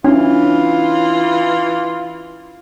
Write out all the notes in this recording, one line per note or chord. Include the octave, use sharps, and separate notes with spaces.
E3 C#4 D4 E4 F4